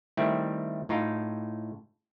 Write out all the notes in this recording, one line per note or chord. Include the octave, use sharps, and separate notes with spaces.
D#3 G3 A3 C4 E4
A2 D#4 F4